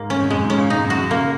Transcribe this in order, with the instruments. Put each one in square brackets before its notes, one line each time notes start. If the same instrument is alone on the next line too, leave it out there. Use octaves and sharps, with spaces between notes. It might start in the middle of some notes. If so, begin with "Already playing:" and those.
Already playing: [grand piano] G#2 [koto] A#3
[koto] C#4
[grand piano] F2
[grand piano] F#2 [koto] G#3
[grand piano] G#2
[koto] C#4
[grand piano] A#2
[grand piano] G#2 [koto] D#4
[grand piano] F#2
[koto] F#4
[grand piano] F#2
[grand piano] C#3 [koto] A#3